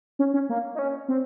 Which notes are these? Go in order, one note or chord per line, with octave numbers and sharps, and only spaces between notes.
C#4
C#4
A#3
D#4
C#4
C4